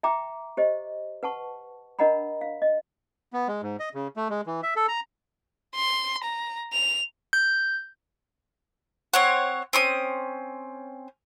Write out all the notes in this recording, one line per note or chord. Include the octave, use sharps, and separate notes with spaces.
E5 G5 A#5 D6
G4 C5 D#5
B4 F#5 A5 C#6
D4 A#4 D#5 F#5 A#5 B5
F5
D#5
B3
G#3
G#2
D#5
C#3
A3
G#3
E3
E5
A4
A#5
C6
A#5
F7
G6
C4 C#5 F#5
C4 C#4 D#6